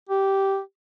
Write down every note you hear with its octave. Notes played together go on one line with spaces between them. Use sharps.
G4